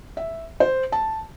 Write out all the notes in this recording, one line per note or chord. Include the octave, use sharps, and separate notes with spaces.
E5
C5
A5